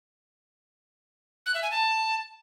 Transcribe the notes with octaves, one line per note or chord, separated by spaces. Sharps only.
F#6
E5
G#5
A5